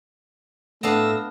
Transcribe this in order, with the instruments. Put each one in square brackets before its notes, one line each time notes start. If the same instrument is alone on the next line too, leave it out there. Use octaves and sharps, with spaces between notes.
[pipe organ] A2 E6 A#6 [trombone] A3 [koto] B3 D4 F5